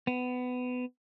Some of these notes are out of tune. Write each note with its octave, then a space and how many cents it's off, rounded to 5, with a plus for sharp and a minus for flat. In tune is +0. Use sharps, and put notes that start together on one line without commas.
B3 +20